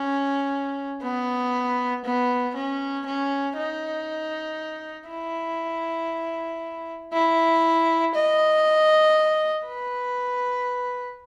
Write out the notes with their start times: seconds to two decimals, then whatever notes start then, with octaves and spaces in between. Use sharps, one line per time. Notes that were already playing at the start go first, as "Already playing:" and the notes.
Already playing: C#4
1.03 B3
2.05 B3
2.55 C#4
3.06 C#4
3.57 D#4
5.09 E4
7.13 E4
8.15 D#5
9.67 B4